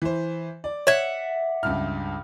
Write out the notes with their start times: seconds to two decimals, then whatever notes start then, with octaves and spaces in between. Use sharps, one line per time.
0.02 E3 C5
0.64 D5
0.87 C#5 E5 F#5 G#6
1.63 C#2 G2 F6